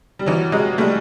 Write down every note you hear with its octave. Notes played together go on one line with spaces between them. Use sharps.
G3
E3 F#3
F#3 G#3
G3 A3